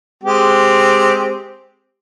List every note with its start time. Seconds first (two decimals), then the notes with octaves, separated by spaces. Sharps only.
0.24 G#3 C4 G4